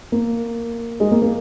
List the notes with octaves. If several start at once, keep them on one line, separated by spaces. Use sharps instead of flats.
A#3
G#3
A#3
A#3